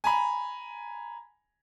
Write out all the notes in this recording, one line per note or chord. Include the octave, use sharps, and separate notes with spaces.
G#5 A#5 B5